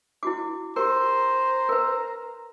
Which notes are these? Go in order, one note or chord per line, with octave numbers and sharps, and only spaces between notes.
E4 F#4 D6
G4 A#4 C5 A#5
A#4 B4